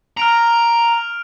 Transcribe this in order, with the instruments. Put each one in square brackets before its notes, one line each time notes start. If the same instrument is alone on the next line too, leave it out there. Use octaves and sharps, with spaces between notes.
[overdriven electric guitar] A#5 [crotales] F6 D7 F7